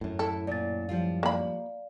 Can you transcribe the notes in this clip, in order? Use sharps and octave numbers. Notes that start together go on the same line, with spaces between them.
F#2 A2
E4 A4
A#2 D5 A6
F3 G3 F4
A#3 D5 F5 B5